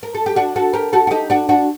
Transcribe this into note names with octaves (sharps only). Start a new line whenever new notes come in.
A#4
A4
G4
D4 F#4
F#4 A4
G4 A#4
F#4 A4
F#4
D#4 G4
D4 F#4
D4 F#4